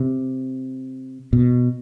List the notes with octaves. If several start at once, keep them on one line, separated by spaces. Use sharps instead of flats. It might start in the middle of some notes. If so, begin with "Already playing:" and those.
Already playing: C3
B2